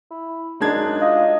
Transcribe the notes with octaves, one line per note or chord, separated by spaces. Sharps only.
E4
F#2 G#3 D4 D#4 G#6
F4 D#5